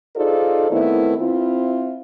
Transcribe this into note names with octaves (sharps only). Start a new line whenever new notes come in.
D#4 F4 G#4 A4 C5 D5
D#3 A3 B3 C4 E4
C4 E4 F4